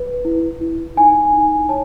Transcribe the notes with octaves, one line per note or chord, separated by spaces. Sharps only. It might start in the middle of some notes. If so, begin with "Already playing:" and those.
Already playing: B4
E4
E4
D#4 G#5
D#4
C#5 A5